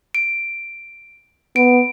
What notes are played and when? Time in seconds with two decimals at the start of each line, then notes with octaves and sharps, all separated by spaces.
0.15 D7
1.56 B3 D7